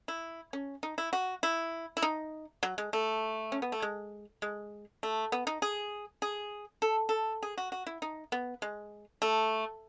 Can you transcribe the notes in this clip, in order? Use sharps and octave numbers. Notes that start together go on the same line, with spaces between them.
E4
C#4
D#4
E4
F#4
E4
E4
D#4
F#3
G#3
A3
C#4
B3
A3
G#3
G#3
A3
B3
D#4
G#4
G#4
A4
A4
G#4
F#4
F#4
E4
D#4
B3
G#3
A3